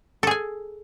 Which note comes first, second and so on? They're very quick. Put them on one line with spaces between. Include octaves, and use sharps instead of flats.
A4 G#4 G#5